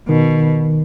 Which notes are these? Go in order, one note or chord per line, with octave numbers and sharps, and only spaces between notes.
B2 D#3